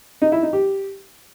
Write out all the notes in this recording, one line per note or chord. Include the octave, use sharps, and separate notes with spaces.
D#4
E4
D#4
G4